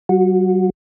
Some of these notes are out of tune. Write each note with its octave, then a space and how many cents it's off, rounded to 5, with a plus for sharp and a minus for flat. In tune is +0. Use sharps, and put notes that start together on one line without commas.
F#3 +45 F#4 -20